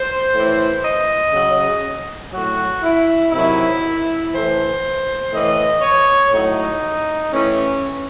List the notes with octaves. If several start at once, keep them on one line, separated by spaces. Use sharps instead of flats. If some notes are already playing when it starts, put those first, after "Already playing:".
Already playing: C5
A2 E3
D#5
C#3 F#3
A2 F#3 F#4
E4
C3 D#3 F#3 E4
A2 E3 C5
A2 E3 D#5
C#5
A2 F#3 D#4
A2 E3 C#4